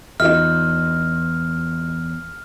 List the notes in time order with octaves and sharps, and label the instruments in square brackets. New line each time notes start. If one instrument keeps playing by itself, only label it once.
[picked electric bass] E2 [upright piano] D#4 F4 D#5 [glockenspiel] F6